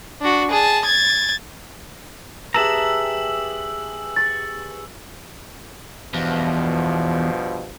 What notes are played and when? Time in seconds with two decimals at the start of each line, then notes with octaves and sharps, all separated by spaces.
0.21 D4 F#4
0.51 G#4 A5
0.85 G#6 A6
2.54 G4 G#4 B4 E5 A5 A#5 E6 F#7
4.16 C#6 A6
6.14 E2 G2 B2 F3